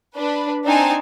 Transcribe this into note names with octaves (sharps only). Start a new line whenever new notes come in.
D4 B4
C4 D4 D#4 G#5 A5